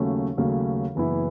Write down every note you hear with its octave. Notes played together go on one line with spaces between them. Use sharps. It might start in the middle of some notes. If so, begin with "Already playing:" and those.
Already playing: D#2 C#3 F#3 A3 C#4
D#2 C#3 F#3 A3 C#4
F#1 F#2 E3 B3 E4